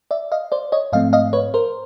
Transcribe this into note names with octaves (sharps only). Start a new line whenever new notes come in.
D5 E5
D#5 F5
C5 D5
C#5 D#5
G#2 F3 A3 C4 D#5 F5
D#5 F5
B4 C#5
A#4 C5